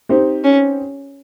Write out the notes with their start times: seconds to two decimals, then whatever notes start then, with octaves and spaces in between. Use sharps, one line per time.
0.09 C4 D#4 G4 C5
0.44 C#4